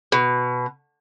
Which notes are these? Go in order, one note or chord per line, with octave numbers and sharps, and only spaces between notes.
B2